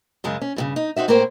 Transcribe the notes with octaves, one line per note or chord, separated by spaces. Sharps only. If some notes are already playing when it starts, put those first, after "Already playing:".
F#2 C#3 G#3
C#4
G2 A#2 C#3
D#4
C4 D#4 F#4 E5
A2 A#3 C4 E4 A#4 C5